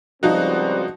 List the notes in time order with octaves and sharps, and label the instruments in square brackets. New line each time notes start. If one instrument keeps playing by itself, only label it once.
[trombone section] C#2 G3 C4 [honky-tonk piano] F3 D#4 F#4